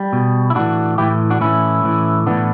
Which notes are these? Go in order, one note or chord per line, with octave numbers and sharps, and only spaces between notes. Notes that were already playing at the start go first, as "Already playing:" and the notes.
Already playing: G3
B2
E4
A2 E3 D4 F#4
A2 E3 E4 G4
D4 F#4
A2 E3 C#4 E4
A2 E3
A2 E3 B3 D4